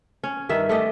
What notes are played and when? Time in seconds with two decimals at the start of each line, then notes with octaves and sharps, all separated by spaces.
0.24 C#4
0.49 G2 D#3 E5
0.69 A3 G4 D#5